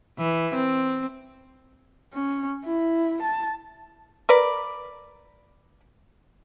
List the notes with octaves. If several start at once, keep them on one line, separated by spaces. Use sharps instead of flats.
E3
C4
C#4
E4
A5
A#4 B4 D5